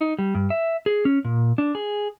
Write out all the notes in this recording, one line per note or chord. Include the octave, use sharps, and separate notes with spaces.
D#4
G3
G2
E5
G#4
C#4
A#2
D4
G#4